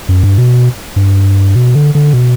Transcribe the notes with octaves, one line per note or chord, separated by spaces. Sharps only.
F#2
G2
B2
G2
B2
D3
D3
B2